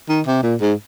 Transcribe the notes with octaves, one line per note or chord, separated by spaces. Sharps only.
D#3
C3
A#2
G#2